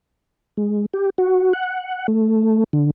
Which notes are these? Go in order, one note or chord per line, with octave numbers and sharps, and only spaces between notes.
G#3
G4
F#4
F#5
A3
D3